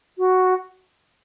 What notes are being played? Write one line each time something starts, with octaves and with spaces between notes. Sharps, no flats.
F#4